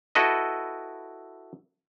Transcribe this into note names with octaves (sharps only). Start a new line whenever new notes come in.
E4 F#4 A4 B4 D#5